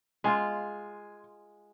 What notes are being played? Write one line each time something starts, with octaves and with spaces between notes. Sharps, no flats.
G#3 F4 G#5 C6